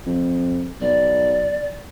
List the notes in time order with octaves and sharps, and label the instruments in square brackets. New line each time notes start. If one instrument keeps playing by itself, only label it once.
[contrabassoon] F2
[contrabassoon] B1 [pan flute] D5